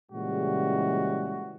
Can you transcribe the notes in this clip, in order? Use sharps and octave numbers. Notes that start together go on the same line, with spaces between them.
A#2 C#3 E3 G3 G#3 F#4